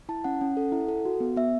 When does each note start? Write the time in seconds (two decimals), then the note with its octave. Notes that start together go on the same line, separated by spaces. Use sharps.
0.09 E4 A5
0.24 C#4 F#5
0.41 C#4
0.57 A4
0.72 E4
0.88 A4
1.05 F#4
1.20 B3
1.37 B3 E5